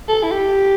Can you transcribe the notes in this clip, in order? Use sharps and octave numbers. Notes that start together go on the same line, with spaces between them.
A4
E4
G4